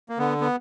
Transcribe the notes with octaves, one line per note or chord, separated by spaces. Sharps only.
A#3
D3 B3
B3